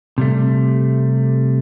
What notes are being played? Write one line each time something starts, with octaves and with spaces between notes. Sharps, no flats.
C3 G3 A3